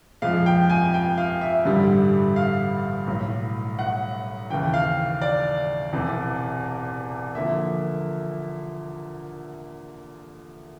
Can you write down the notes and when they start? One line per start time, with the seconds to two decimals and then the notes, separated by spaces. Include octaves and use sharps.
0.22 F2 C3 F3 G#3 F5
0.46 G5
0.70 G#5
0.94 G5
1.18 F5
1.41 E5
1.65 A1 G2 D3 G3
2.36 F5
3.07 B1 A2 F#3
3.79 F#5
4.50 D#2 C#3 E3 G5
4.74 F5
5.22 D5
5.92 E1 E2 C3 E3
7.35 D3 F3 A#3 E5